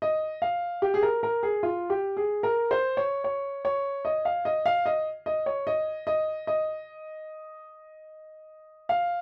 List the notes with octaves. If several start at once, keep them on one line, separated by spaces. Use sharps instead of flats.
D#5
F5
G4
G#4
A#4
A#4
G#4
F4
G4
G#4
A#4
C5
C#5
C#5
C#5
D#5
F5
D#5
F5
D#5
D#5
C#5
D#5
D#5
D#5
F5